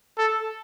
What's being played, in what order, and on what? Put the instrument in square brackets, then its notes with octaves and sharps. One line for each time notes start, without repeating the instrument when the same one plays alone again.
[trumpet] A4